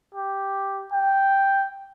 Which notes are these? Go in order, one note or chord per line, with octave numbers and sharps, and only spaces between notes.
G4
G5